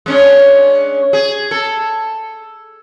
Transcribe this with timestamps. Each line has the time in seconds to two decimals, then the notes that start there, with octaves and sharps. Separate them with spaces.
0.06 G#3 C#4 D4
1.13 G#4
1.51 A4